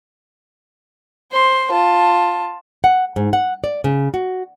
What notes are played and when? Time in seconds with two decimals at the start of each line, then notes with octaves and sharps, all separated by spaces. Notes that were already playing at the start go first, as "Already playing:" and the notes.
1.32 C5 C6
1.72 F4 A5
2.84 F#5
3.16 G#2
3.33 F#5
3.64 D5
3.84 C#3
4.14 F#4